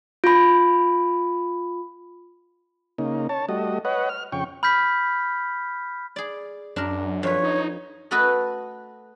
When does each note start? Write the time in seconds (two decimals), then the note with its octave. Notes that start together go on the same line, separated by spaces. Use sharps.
0.24 F4 B5
2.98 C#3 A#3 D#4
3.29 C#5 A5
3.49 G3 A3 F#4 D#5
3.85 B4 C#5 D#5 F#5
4.09 F6
4.32 F2 C#3 G5 C#6
4.63 B5 F6 G6 B6
6.16 G#4 D5
6.76 F#2 D4 A#4
7.23 F2 B4 C#5
7.43 D#4
8.11 A3 F#4 A4 B4 D#5